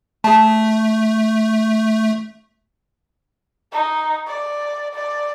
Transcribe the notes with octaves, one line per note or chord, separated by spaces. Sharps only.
A3 G#4 A5
D#4
D5
D5